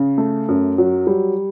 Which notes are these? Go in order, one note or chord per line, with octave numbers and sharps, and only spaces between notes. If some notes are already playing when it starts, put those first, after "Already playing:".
Already playing: C#3
A3
F#2
F#3
G3